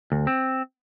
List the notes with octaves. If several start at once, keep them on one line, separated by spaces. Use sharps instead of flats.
D2
C4